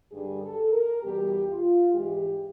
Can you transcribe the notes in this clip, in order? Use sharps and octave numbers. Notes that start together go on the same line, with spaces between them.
G2 D3 G3 G#4
A4
A#4
E2 B2 G3 G4
F4
G#2 E3 G#3 G4